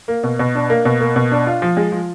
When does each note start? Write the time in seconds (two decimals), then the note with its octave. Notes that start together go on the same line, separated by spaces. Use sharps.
0.08 A#3
0.23 B2
0.39 B2
0.55 D4
0.70 A#3
0.85 B2
1.00 A#3
1.16 B2
1.32 D4
1.47 F4
1.62 F3
1.77 G#3
1.92 F3